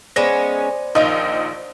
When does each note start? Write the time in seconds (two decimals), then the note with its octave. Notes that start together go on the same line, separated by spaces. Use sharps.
0.16 G#3 B3 C#4 C5 D5 B5 A#6
0.95 A#1 D#3 F3 D#4 D#5